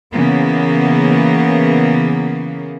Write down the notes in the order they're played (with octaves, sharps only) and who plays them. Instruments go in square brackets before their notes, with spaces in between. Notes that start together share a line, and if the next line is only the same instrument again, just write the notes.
[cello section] C#3 E3 A#3 B3